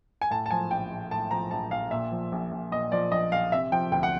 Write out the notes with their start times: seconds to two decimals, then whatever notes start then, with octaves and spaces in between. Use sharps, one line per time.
0.21 G#5
0.30 A2 A5
0.46 A5
0.51 F3 G#5
0.71 A#1 G5
0.91 A#1
1.11 A2 A5
1.31 F3 A#5
1.51 A#1 A5
1.71 A#1 F5
1.91 A#2 E5
2.12 F3
2.32 A#1
2.52 A#1
2.71 A#2 D#5
2.92 F3 D5
3.12 A#1 D#5
3.32 A#1 F5
3.52 C3 E5
3.72 F3 G5
3.92 D2 G5
4.03 F#5